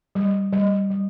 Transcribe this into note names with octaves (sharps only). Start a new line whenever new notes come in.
G3
G3
G3